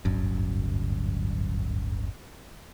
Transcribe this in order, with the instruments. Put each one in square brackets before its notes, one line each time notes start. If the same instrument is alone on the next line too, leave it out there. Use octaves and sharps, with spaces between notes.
[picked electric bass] D1 G1 F#2